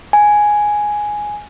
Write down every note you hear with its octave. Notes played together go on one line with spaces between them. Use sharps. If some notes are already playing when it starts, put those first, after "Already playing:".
G#5